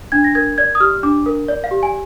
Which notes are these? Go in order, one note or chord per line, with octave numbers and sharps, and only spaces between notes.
D4 G#6
A#6
A#4 G#6
D5 G#6
D#6
G4 F6
D4 D6
A#4
D5
F5
G4
G#5